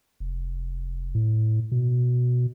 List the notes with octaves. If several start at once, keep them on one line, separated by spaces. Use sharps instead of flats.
F1
A2
B2